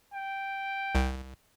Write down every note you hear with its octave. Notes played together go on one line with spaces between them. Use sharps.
G5
C2